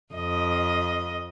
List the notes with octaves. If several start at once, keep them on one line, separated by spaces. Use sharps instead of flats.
F2 D#5